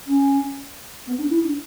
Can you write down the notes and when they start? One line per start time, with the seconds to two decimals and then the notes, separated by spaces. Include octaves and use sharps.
0.06 C#4
1.06 B3
1.18 D4
1.30 E4
1.42 D4